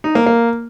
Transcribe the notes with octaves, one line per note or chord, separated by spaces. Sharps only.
D#4
A#3
A#3